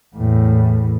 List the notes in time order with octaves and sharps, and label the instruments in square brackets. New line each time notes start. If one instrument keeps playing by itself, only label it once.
[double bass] E2 A2